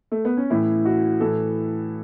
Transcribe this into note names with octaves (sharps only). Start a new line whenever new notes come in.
A3
B3
C#4
A2 E3 E4
F#4
A2 E3 A4